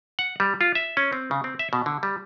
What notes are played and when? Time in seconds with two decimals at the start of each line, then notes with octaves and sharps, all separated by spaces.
0.19 F#5
0.40 G3
0.61 F4
0.75 E5
0.97 C#4
1.13 C4
1.31 C#3
1.44 C4
1.59 E5
1.73 B2
1.86 D3
2.03 G3